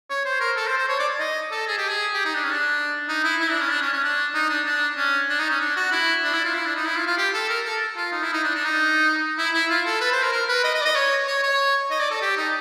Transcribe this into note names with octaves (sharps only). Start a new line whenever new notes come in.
C#5
C5
A#4
A4
C5
C5
C#5
D5
D#5
A4
G#4
G4
G#4
G4
D#4
D4
C#4
D4
D#4
E4
E4
D4
C#4
D4
C#4
C#4
D4
D#4
D4
D4
C#4
D4
D#4
C#4
D4
F#4
E4
D4
E4
F4
E4
D4
D#4
E4
F4
F4
G4
A4
A#4
A4
F4
D#4
E4
D#4
D4
D4
D#4
E4
E4
F4
A4
B4
C5
A#4
A#4
B4
D#5
D#5
D5
D#5
C#5
C#5
C#5
D#5
D5
A4
G4
D#4